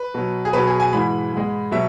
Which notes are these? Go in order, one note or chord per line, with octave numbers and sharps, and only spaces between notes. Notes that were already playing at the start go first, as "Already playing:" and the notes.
Already playing: B4
B2 F#3
G#4
B2 F#3 B4
G#4
G#5
G#2 E3 G#3 B5
G#2 G#3
B2 F#3 E5